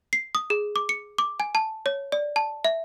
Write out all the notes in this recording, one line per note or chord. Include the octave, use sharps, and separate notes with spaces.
C7
D#6
G#4
D6
C#7
D6
G#5
A5
C#5
D5
A5
E5